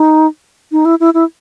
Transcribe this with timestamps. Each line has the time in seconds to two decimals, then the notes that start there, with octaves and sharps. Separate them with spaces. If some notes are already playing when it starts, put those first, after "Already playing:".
Already playing: D#4
0.72 D#4
0.85 E4
1.00 E4
1.14 E4